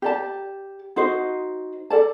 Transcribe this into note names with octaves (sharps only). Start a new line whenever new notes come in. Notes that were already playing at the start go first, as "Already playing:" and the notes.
G4 D5 A5
D#4 F#4 C5 D#5
A4 D5 A5